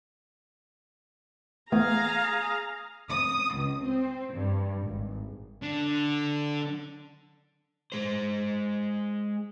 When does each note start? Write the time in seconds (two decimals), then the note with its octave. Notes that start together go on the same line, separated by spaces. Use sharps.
1.72 E3 A3 B3 G#4 F5 A#5
3.09 D#6
3.56 C#2
3.84 C4
4.35 G2
4.82 G#1
5.62 D3
7.92 G#3 C5